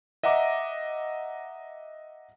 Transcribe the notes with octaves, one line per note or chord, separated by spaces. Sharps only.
D#5 E5 F#5 A#5 D6